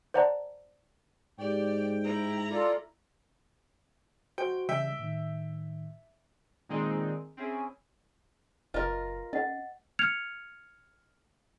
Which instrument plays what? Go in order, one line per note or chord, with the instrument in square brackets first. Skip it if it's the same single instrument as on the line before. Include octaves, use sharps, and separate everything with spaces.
[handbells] C5 D5 F#5 A5 A#5
[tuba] G#2 [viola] G4 D5 [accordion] G5
[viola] E4 A#5
[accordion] F4 A4 D5
[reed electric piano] F#4 C5 [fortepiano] G5
[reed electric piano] C#3 E3 G3 [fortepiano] E5 G5
[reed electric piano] A2 D#3
[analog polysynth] A#2 D#3 G#3 C4 D#4 G#4
C4 C#4 E4 G#4
[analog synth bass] F#1 [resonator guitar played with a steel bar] F4 A#4 [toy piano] B4 D#5
[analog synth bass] C#4 [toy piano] D#5 F#5
[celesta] F6 G#6 C#7 F7